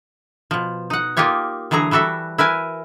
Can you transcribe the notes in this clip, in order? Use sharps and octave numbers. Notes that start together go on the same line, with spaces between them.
B2 F3
D#4 F#5
A#3 D#4 F4 G4 C#5
D3 E3 F#3 G#4 A#5
E3 G3 F#4 A4 E5
E4 A#4 B4 G#5